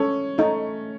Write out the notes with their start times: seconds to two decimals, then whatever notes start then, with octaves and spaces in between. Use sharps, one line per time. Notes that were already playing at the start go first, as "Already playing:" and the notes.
Already playing: C#4 A4
0.38 A3 D#4